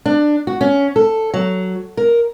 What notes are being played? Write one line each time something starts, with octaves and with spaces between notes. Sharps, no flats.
D4
F#4
C#4
A4
F#3
A#4